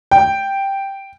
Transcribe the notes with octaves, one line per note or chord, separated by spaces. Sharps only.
G5